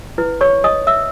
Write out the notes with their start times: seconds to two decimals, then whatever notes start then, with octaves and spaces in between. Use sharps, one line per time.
0.18 E4 B4
0.41 C#5 C#6
0.64 D#5 D#6
0.87 E5 E6